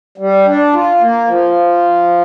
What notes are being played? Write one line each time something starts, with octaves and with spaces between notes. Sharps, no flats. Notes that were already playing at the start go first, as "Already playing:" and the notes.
G3
D4
F4
A#3
F3